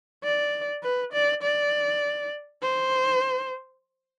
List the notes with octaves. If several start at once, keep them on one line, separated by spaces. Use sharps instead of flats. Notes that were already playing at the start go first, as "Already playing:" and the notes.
D5
B4
D5
D5
C5